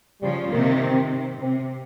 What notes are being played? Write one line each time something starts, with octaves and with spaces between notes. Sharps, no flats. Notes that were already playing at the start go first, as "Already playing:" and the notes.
C#3 F3 G3
C3 D#3 A#3
C4
C3
C3 C4